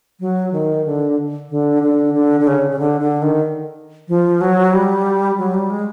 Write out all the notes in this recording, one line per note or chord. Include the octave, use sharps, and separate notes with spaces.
F#3
D#3
D3
D3
D3
D3
D3
C#3
C#3
D3
D3
D#3
F3
F#3
G3
F#3
G3
G#3